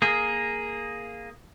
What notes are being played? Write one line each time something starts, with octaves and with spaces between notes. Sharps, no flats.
A#3 G#4